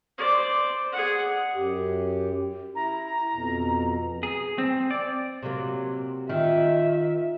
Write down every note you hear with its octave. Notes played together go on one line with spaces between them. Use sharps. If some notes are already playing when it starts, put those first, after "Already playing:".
C5 D5
G#4 F#5
F#2 G4
E4 A#5
F2 B2
G#4
C4
D5
C3 F#3 A#3
D#3 F4 E5